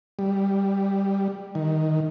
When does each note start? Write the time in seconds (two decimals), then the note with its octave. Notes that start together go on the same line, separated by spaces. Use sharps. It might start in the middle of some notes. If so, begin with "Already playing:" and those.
0.19 G3
1.55 D#3